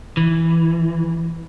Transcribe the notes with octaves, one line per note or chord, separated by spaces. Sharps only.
E3